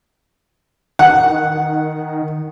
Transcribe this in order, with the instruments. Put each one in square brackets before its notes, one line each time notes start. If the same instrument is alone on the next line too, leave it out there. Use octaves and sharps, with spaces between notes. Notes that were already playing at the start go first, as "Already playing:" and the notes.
[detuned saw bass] D#3 [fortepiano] F#5